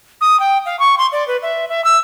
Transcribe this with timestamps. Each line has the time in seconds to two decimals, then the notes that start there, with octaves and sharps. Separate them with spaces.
0.21 D#6
0.40 G5
0.66 F5
0.79 C#6
0.98 C6
1.12 D5
1.28 B4
1.42 E5
1.69 E5
1.84 E6